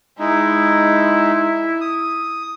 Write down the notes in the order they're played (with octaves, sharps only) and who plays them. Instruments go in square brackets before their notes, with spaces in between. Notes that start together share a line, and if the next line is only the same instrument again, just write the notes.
[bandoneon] G#3 D#4 [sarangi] E4
[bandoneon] D#6